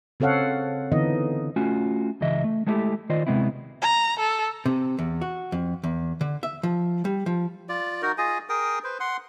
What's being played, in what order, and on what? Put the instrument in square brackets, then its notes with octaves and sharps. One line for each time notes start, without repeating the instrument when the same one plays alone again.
[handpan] C#3 C4 A4 C#5 F5 F#5
D3 E3 B3 D#4 D#5
[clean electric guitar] A3 C#4 F4 F#4
C#2 C#3 E3 D#5 E5
A3
G#3 A3 B3 E4 G4 A4
D#3 F4 C5 D5 D#5
C3 G#3 B3 C4 E4
[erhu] A#5
A4
[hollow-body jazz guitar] C3
E2
F#4
F2
E2
D3
E5
F3
G3
F3
[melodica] F4 D5
D#4 F#4 A#4
F4 G#4 D#5 G#5
G#4 A#4 G5 D#6
B4 C5
F#5 C6